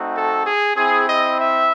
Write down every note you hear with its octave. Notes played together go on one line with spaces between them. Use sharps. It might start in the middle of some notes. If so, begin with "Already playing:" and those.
Already playing: A3 C4 D#4 F#4
A4
G#4
C4 E4 G#4
D#5
E5